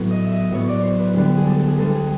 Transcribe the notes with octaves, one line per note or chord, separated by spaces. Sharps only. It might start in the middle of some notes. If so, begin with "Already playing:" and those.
Already playing: A2 F#3 B3
D#5
E5
D#5
A2 F#3 B3 C#5
D5
C5 C#5
B4
D2 D3 G3 B3
G#4
A4
G#4
D2 D3 G3 B3 A4
G#4